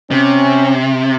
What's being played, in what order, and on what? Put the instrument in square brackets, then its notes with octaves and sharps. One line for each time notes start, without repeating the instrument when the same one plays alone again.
[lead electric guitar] C3 [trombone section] C#4